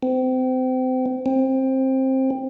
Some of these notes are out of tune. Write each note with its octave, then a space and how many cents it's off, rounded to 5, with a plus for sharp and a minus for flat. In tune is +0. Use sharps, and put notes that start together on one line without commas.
C4 -30
C4 +15